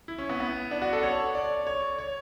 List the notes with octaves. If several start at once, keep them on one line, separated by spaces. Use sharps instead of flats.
E4
C#4
B3
B3
D4
F#4
A4
C#5
D5
C#5
C#5